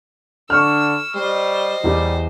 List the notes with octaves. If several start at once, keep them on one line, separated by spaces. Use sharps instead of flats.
D3 C#6 E6 F6
G3 C5 D#5
E2 G3 E4 G4